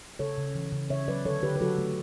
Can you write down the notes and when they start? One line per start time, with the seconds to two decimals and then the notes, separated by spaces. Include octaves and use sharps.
0.19 C#3 A4 C#5
0.37 C#3
0.55 E3
0.72 C#3
0.90 C#3 C#5 E5
1.08 F#3 B4 D5
1.25 D3 A4 C#5
1.43 D3 G4 B4
1.56 B4
1.61 F#3 F#4 A4
1.78 A3